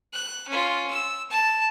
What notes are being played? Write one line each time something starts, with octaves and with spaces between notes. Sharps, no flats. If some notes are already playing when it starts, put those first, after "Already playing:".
F#6
C#4 F4
E6
A5